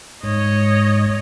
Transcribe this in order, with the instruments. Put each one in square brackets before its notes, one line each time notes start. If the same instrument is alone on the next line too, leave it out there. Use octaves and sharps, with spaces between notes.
[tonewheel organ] G#2 [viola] C#5 D#5